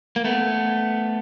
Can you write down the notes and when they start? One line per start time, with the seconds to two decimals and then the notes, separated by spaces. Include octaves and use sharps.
0.16 A#3
0.24 A3 B3